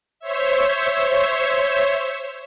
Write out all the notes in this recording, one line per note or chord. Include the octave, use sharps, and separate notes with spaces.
C5 C#5 E5